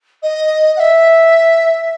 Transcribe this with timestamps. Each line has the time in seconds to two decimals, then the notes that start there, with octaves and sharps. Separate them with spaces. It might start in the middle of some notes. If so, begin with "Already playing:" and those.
0.22 D#5
0.76 F#5
0.79 E5